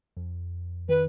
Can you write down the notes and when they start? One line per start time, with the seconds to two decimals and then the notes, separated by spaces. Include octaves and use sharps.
0.17 F2
0.89 D#3 B4